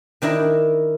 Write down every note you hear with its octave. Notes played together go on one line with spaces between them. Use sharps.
D#3 D4 E4 A#4